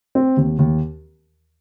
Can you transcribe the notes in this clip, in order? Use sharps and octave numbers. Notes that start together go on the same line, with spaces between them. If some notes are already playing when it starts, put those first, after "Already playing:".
C4
D#2
D#2